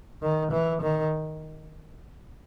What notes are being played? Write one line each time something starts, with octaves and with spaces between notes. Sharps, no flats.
D#3
E3
D#3